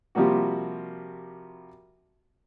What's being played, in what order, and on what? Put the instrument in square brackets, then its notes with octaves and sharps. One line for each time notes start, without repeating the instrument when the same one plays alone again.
[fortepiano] C3 F3 G3 A#3 F#4